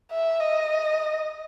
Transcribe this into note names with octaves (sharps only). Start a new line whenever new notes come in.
E5
D#5